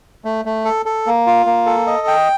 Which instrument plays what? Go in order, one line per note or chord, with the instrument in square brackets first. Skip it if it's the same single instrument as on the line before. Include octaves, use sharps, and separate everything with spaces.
[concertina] A3
A3
A4
A4
A#3
F4
A#3
A4
D#5
G5